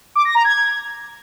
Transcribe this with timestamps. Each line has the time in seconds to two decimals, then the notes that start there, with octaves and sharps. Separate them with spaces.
0.15 D6
0.25 A#6
0.35 A#5
0.44 G#6